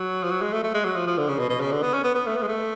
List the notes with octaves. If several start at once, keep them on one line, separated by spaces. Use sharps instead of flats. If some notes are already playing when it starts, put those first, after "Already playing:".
Already playing: F#3
F3
F#3
G#3
A3
A3
G#3
F#3
F3
F3
D3
C#3
B2
B2
C#3
D3
B3
C#4
B3
B3
A3
B3
G#3
A3